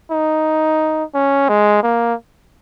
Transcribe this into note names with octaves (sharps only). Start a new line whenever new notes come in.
D#4
C#4
G#3
A#3